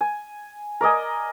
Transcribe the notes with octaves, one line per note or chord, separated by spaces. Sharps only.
G#5
A#4 D5 D#5 G#5